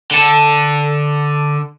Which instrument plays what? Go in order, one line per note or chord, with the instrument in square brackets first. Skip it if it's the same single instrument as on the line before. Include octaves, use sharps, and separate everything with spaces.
[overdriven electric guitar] D3 A4